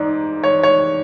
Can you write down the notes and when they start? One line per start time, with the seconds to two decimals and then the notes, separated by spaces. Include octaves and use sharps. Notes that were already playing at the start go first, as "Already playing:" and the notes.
Already playing: G#2 D#4 D5
0.44 C#5
0.63 C#5